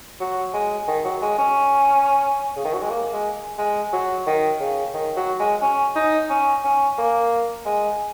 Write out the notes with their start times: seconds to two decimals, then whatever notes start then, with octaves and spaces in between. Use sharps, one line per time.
0.20 F#3
0.53 G#3
0.87 D#3
1.04 F#3
1.22 G#3
1.38 C#4
2.56 C#3
2.64 D#3
2.74 F#3
2.81 G#3
2.91 A#3
3.13 G#3
3.58 G#3
3.92 F#3
4.26 D#3
4.60 C#3
4.94 D#3
5.16 F#3
5.40 G#3
5.62 C#4
5.95 D#4
6.30 C#4
6.64 C#4
6.98 A#3
7.65 G#3